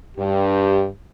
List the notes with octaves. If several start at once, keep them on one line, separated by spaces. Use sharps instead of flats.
G2 G4